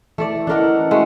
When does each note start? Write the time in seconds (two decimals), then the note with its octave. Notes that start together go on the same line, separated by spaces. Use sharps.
0.18 E3 A3 A4 D5
0.47 E3 C#4 D4 E4 A4 A#4 D#5 F#5
0.91 G#3 A3 F#4 G#4